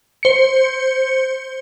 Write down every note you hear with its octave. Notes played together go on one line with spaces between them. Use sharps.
C5 C#7